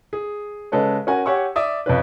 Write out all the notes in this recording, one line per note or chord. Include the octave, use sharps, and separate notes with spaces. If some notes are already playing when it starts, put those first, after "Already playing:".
G#4
C#3 G#3 A4 B4 C#5
C#4 F#4 A#4 C#5 F#5 G#5
G4 C#5 F#5 G#5 C#6 E6
D5 E5 D#6
F2 C#3 C#4 B4